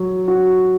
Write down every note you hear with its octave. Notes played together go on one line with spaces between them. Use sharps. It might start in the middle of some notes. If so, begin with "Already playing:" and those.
Already playing: F#3 F#4
F#4